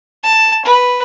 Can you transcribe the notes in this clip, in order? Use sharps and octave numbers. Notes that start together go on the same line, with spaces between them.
A5
B4